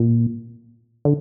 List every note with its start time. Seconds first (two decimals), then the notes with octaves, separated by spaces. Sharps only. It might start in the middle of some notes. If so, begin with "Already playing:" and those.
Already playing: A#2
1.05 D3